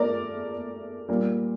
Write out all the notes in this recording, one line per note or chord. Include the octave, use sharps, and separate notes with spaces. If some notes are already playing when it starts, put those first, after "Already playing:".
Already playing: A3 A#4 D5
A#2 G3 A#3